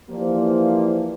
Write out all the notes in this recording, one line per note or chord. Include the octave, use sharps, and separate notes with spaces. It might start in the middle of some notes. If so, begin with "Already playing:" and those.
E3 F3 A#3 G4 C5 D5